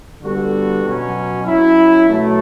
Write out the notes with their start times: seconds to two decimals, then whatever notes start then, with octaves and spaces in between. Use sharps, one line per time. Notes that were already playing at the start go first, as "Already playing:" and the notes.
0.21 D3 G3 B3 F#4 A4
0.83 B2 F#3 C#4
1.44 F#3 C#4 E4
2.07 B2 F#3 A3 E4